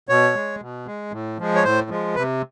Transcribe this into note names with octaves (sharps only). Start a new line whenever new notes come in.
B2 C#5
G#3
B2
G#3
A2
F3 G#3
C#5
A2 C5
F3 G#3
C3 B4